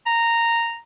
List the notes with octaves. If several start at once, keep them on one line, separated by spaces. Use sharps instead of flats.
A#5